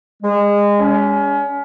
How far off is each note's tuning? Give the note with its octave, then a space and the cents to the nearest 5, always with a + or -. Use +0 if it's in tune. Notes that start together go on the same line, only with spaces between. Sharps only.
G#3 -25
C#4 +30